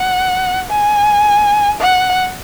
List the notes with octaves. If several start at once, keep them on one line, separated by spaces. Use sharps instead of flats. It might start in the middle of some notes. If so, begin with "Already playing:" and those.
Already playing: F#5
G#5
F#5